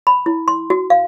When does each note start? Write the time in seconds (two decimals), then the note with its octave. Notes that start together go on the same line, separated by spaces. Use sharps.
0.07 B5
0.26 E4
0.48 C6
0.70 F#4
0.90 F5